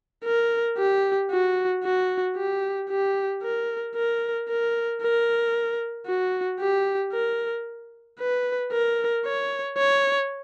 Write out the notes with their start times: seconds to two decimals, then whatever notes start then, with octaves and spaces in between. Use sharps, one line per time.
0.25 A#4
0.78 G4
1.31 F#4
1.84 F#4
2.36 G4
2.90 G4
3.43 A#4
3.95 A#4
4.48 A#4
5.02 A#4
6.07 F#4
6.60 G4
7.13 A#4
8.19 B4
8.72 A#4
9.25 C#5
9.78 C#5